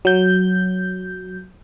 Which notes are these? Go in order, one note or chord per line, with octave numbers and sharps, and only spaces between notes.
F#3 G6